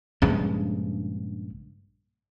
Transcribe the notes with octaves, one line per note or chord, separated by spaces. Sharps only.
A#1 G2 C#3 G#3